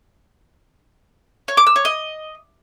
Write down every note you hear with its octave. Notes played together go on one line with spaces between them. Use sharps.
C#5
D6
E6
C#5
D#5